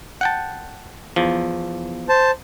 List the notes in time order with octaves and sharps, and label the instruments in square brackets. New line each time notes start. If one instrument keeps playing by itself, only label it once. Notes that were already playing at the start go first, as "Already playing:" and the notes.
[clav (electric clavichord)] F#5 G5 A5
E2 F3
[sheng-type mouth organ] C5 A5